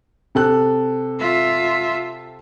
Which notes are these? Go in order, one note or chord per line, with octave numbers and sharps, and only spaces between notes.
C3 A4 F#6
F4 E5